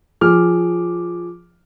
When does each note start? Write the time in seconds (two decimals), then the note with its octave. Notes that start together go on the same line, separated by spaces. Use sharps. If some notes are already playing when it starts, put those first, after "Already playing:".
0.21 F3 G#4 D6 F6